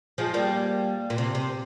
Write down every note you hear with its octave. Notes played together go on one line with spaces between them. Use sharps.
F3 G#3
G3 A#3
A#2
C3
C3